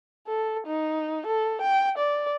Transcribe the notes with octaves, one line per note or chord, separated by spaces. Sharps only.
A4
D#4
A4
G5
D5